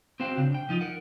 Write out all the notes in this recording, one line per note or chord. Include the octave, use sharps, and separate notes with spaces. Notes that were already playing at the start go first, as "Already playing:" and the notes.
C4 F#4 C5 F5 G5
C#3 D4
G5
F3 D#4 F4
A#4 F#5